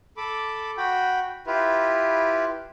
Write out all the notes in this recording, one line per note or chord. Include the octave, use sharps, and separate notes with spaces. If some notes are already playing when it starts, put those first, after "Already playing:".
A4 B5 D6
F#4 G5 B5
E4 F4 G4 B4